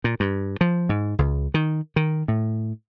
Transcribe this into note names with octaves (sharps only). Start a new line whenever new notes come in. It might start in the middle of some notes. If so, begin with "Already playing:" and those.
A#2
G2
F3
G#2
C#2
D#3
D#3
A2